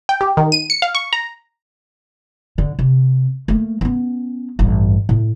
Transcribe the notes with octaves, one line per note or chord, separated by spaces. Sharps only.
G5
G4
D#3
D#7
C#7
F5
C#6
A#5
D3
C3
A3 A#3
B3 C#4
A1 G2
A2